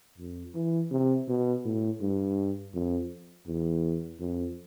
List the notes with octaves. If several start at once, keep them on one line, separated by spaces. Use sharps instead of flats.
F2
E3
C3
B2
A2
G2
F2
E2
F2